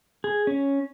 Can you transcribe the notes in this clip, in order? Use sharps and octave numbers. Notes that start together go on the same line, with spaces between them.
G#4
C#4